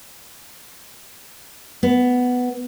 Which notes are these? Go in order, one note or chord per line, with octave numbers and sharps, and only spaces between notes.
B3